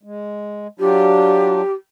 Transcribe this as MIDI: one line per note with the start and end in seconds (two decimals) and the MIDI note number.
0.03 0.67 56
0.79 1.62 54
0.79 1.62 62
0.79 1.62 65
0.79 1.72 67